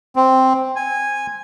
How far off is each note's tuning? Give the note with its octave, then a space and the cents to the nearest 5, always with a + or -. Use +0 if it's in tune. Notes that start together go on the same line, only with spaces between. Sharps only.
C4 +0
G#5 -10